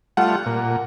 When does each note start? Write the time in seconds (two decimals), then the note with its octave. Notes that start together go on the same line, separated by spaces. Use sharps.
0.17 G3 A3 F4 F#5
0.46 A#2